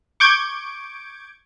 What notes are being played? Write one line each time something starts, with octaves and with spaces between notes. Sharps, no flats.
C#6 D6 G6 G#6 D7